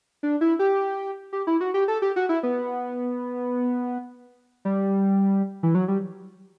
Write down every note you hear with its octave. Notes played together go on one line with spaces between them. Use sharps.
D4
E4
G4
G4
E4
F#4
G4
A4
G4
F#4
E4
B3
G3
E3
F#3
G3